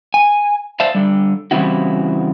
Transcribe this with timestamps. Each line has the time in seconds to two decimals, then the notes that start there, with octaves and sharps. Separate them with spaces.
0.14 G#5
0.80 C5 D5 E5 F5 A5
0.95 D3 G3
1.51 C#3 E3 G3 C4 E4 F#4